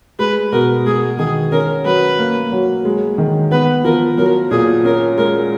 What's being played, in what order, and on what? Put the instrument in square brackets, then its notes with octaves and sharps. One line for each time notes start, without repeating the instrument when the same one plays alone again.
[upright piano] G#3 [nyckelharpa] B4
[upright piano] B2 [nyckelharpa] A#4
[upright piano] G#3 [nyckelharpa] G#4
[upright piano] D#3 [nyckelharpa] G#4
[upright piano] C#4 [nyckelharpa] A#4
[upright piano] F#3 [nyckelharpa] B4
[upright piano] A#3
F#3
G#3
D#3
[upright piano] B3 [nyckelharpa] B4
[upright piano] F3 [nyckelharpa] A#4
[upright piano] F#3 [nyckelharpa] A#4
[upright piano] A#2 [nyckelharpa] G#4
[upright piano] C#4 [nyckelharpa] A#4
[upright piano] G#3 [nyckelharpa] A#4